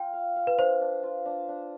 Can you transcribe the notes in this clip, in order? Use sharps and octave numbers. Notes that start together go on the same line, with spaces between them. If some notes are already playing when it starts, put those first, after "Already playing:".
Already playing: F4 G5
F5
F5
B4
D4 C5
D4
F4
D4
D4